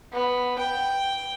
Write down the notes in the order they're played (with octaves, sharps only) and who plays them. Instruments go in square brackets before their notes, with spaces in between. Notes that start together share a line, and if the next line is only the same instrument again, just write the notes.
[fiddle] B3
G5